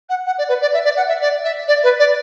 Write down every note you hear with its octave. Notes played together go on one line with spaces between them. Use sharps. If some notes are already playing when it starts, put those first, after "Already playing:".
F#5
F#5
D5
B4
D5
E5
D5
F#5
E5
D5
E5
D5
B4
D5